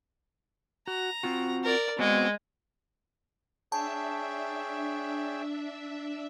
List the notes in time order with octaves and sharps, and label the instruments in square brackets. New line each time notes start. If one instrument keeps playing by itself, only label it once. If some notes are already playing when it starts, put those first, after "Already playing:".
[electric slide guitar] F#4 [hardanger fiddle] A#5
[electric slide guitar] C4 F4 F#4
[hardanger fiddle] A#4 D5
[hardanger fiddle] G#3 [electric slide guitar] B3 C4 F#4
[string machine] D4 E5 [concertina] G#4 C#5 G5 [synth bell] A5